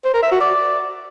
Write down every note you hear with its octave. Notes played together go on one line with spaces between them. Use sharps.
C5
A#4
E5
F#4
D5